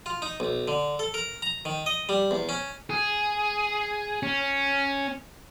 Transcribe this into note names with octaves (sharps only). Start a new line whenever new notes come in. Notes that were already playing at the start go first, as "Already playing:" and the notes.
F4
D#4
B1
D3
A4
A#4
A#5
D#3
D#5
G3
E2
C#4
G#4
C#4